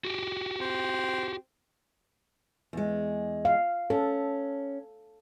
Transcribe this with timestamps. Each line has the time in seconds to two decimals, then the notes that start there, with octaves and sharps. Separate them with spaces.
0.05 F#4 G4
0.61 C4
2.73 E2 G#3
3.45 F5
3.90 C#4 A4